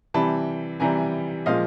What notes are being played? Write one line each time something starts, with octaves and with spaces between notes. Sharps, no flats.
C3 E3 G3 A5 B5
C3 E3 G3 G#5 A#5
A#2 F3 G#3 D#5 F5